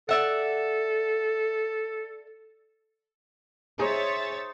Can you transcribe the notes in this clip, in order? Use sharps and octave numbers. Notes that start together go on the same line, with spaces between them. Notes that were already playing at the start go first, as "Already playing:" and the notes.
A4 D5 E5 F#5
D#4 G#4 C5 C#5 E5 A6